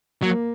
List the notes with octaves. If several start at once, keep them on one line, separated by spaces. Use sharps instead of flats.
F#3 A#3